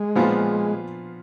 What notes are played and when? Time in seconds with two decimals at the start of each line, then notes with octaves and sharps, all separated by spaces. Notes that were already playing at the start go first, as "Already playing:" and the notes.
Already playing: G#3
0.15 A#2 F3 B3 F4